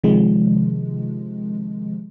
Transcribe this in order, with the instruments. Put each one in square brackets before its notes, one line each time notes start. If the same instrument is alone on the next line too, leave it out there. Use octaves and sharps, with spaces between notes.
[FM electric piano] C3 D#3 F3 G#3